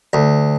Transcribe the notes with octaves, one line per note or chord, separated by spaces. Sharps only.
D2